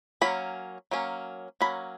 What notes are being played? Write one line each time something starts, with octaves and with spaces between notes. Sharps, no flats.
F#3 A#3 C#4 B5
F#3 A#3 C#4
F#3 A#3 C#4 B5